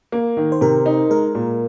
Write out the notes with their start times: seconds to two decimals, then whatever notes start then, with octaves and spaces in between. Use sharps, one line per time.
0.12 A#3
0.37 D#3
0.52 C5
0.61 C3 A#4
0.86 D#4
1.10 G#3 A#4
1.35 A#2